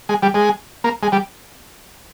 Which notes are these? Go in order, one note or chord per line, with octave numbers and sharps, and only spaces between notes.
G#3
G3
G#3
A#3
G#3
G3